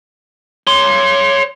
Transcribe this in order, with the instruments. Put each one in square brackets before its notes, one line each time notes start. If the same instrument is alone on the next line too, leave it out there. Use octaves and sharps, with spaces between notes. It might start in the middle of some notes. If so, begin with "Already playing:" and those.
[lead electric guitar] C#5 C6